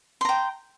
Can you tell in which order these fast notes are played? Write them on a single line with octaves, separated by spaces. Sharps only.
C6 A#5 G5